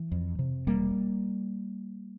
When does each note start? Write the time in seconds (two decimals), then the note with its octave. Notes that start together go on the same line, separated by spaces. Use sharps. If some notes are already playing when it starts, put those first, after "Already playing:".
Already playing: E3
0.12 F2
0.39 C3
0.67 E1 G3 A#3